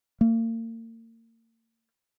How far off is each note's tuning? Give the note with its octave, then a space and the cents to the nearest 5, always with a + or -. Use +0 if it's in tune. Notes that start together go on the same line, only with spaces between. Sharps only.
A#3 -40